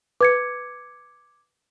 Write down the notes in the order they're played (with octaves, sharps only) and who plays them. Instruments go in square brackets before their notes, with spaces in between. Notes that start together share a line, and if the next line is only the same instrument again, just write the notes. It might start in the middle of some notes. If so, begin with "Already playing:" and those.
[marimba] B4 [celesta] D6 G#6 C#7